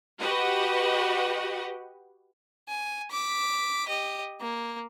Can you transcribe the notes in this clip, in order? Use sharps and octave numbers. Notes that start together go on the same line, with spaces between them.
F#4 G4 B4 D#5 F#5
G#5
D6 B6
G4 D#5
A#3